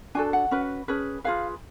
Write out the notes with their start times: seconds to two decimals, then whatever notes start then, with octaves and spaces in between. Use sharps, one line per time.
0.15 D4 F#4 A4 G#5
0.33 F#5
0.51 C#4 F#4 B4
0.88 C#4 G#4 B4
1.24 F4 G#4 B4 F5